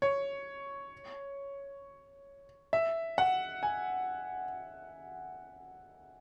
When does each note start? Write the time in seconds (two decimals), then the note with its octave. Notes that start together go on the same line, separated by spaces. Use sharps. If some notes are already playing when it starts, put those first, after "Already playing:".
0.02 C#5
2.73 E5
3.18 F#5
3.63 G#5